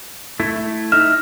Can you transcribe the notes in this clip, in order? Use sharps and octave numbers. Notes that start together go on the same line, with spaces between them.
A3 E4
D#4 E5 F6